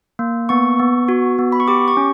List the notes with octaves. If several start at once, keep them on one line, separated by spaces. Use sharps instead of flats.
A#3
B3 C#6
B3
F#4
B3
B5
C#6
G4 D6
C#6
C#4